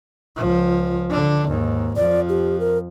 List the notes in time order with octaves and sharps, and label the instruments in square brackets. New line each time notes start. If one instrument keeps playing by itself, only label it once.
[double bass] C#2 F3
D3 D4
D#2 G#2
[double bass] F2 F3 [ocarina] D5
[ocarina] G4
A#4